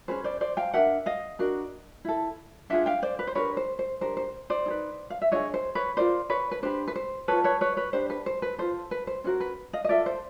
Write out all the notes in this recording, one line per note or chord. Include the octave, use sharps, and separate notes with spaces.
C#4 F4 G#4 B4 C5
C5 D5
C5 D5
F5 G5
D4 G4 A#4 E5 F#5
D#5 F5
D4 F#4 A#4
E4 A4
D4 F4 G#4 E5 F#5
F5 G5
C5 D5
B4
C5
D4 G4 A#4 B4 C#5
C5
C5
D4 G4 A#4 C5
C5
C5 D5
D#4 G#4 B4
F5
E5
D4 F4 G#4 C#5 D#5
C5
B4 C#5
F4 A#4 C5 D5
B4 C#5
B4
D4 G4 B4 C5
B4
C5
F4 A4 B4 C#5
B4 C#5
B4 C#5
B4 C#5
D4 G4 B4 C5
B4
C5
B4
F4 A4 C5
B4
C5
C#4 F#4 A#4 C5
B4
D#5 F5
D#5
F4 A4 D5 E5
C5